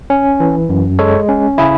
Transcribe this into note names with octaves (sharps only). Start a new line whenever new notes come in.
C#4
E3
F#2
G#3 A4 C#5
C#4
C#3 E4 G#4